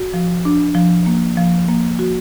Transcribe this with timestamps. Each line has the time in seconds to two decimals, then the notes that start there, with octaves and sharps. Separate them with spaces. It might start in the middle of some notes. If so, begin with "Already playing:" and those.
Already playing: F#4
0.13 F3
0.45 D4
0.75 F3
1.06 A#3
1.37 F3
1.68 A#3
1.99 F#4